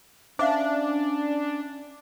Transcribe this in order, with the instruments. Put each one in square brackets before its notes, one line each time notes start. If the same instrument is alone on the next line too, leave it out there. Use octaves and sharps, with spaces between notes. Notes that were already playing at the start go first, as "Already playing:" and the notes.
[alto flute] C#4 [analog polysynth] D4 [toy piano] C5 E5 F5